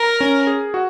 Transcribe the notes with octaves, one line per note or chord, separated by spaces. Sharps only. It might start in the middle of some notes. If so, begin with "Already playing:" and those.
Already playing: A#4
C#4
G#4
F#4